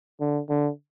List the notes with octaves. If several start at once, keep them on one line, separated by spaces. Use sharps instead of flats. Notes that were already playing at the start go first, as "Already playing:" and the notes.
D3
D3